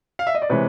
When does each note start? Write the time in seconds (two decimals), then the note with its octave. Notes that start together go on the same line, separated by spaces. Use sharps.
0.19 F5
0.27 E5
0.35 D#5
0.42 D5
0.50 C3 E3 G#3 B4 C#5